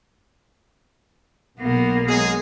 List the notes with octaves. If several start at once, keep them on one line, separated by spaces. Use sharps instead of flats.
B1 A#3 B3
F#3 G#3 G#4